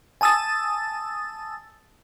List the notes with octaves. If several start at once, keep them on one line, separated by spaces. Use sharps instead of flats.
G#5 A5 D#6 E6 A6